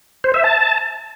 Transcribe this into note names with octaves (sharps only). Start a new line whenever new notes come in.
C5
E5
A5